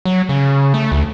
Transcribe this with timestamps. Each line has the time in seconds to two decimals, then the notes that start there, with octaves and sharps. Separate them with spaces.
0.05 F#3
0.29 C#3
0.74 A3
0.92 D2